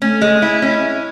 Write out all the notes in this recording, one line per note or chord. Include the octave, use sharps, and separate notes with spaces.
A3 C#4
G#3
E4
C#4